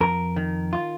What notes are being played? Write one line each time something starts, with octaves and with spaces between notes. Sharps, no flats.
F2 A#4
D#3
F4